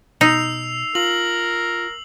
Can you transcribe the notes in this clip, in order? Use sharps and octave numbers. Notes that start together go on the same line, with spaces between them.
B2 D#4 E6 C7 F7
F4 A#4 F#7